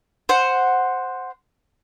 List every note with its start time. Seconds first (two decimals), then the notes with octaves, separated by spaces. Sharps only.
0.29 C5 F#5